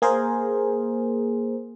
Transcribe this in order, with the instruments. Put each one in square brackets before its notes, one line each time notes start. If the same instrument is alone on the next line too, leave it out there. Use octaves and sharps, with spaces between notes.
[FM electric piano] A#3 G#4 A#4 C5